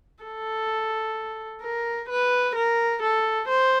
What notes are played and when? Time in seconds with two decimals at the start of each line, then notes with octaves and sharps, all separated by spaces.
0.23 A4
1.62 A#4
2.09 B4
2.55 A#4
3.02 A4
3.48 C5